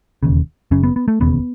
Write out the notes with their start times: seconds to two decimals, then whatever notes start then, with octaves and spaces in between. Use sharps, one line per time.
0.23 E1 D#2 C#3
0.71 F#1 F#2 C#3 C#4
0.83 B3
0.96 B3
1.08 A3
1.20 E1 D#2 C#3 B3